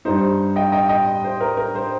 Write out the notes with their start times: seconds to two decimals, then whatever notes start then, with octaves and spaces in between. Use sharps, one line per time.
0.05 G2 G3 D#4 C5
0.56 D#5 G5
0.72 D#5 G5
0.89 D#5 G5
1.24 C5
1.40 A#4
1.57 A#4
1.75 C5